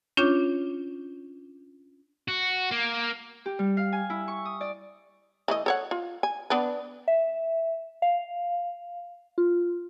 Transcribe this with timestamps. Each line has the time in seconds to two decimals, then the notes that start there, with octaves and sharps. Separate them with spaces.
0.17 C#4 D4 F4 C#5 D6 G6
2.28 F#4
2.71 A#3
3.46 G4
3.59 G3
3.77 F5
3.92 G#5
4.10 E4
4.28 C#6
4.45 D#6
4.61 D5
5.48 E3 A3 D#5
5.66 A4 C#5 F#5
5.91 F4
6.23 G#5
6.50 B3 D4 B4
7.08 E5
8.02 F5
9.38 F4